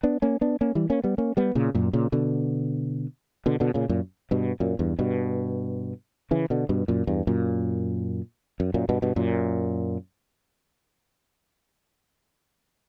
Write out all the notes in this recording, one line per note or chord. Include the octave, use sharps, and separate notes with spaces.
B3 D4
A#3 C#4
B3 D4
A#3 C#4
E3 G3
A#3 C#4
G3 B3
A#3 C#4
G3 B3
A#2 C#3
F#2 A#2
A#2 C#3
B2 D3
B2 D3
B2 D3
A#2 C#3
F#2 A#2
G2 B2
F#2 A#2
E2 G2
G2 B2
C#3 E3
B2 D3
G2 B2
F#2 A#2
E2 G2
F#2 A#2
F#2
F#2 A#2
G2 B2
G2 B2
F#2 A#2